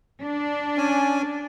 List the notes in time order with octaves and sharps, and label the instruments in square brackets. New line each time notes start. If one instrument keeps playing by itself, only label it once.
[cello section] D4
[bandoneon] C#4 G#5